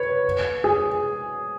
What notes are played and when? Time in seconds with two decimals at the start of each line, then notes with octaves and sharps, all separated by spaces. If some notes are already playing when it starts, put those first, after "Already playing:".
Already playing: B4 C#5
0.64 G#4